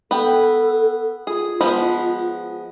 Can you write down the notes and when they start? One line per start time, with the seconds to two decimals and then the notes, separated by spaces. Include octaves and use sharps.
0.11 B3 A4 G5
1.27 F4 G#4
1.61 F3 G#3 B3